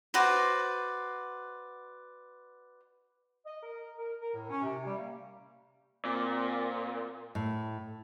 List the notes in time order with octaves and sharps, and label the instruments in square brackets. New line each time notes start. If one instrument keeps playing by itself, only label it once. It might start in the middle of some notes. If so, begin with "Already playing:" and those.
[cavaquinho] F#4 B4 C5 D5
[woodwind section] D#5
A#4
A#4
A#4
A2
C#4
C3
G3
A#3
[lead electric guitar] A#2 [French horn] C4
[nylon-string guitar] A2